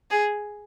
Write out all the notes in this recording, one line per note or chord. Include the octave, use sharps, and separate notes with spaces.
G#4